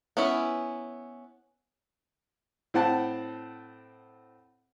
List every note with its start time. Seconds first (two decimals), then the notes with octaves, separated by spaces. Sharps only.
0.17 B3 C#4 E4
2.74 A2 C4 F#5 A5